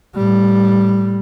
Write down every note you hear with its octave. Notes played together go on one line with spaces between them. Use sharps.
A2 G3